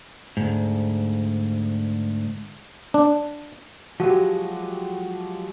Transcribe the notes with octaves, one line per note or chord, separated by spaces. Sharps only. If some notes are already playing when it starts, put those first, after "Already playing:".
D2 G#2
D4
F3 F#3 G#3 F#4 G4